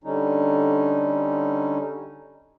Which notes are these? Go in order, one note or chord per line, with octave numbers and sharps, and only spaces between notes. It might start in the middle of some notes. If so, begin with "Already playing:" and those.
D3 G3 C#4 D#4